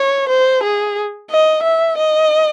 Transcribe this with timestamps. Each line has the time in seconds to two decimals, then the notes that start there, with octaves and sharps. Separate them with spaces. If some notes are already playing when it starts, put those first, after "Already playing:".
Already playing: C#5
0.28 C5
0.63 G#4
1.30 D#5
1.63 E5
1.97 D#5